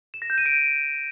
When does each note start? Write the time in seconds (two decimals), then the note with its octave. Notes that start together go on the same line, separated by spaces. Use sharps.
0.14 E7
0.22 A#6
0.30 G6
0.38 D#7
0.46 D7